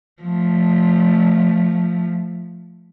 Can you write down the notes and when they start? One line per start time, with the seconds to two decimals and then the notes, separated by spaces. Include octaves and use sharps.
0.22 F3 A3